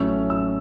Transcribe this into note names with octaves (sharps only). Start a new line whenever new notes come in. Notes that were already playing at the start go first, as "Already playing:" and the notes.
Already playing: A1 A2 F#3 A3 C#4 E6
E6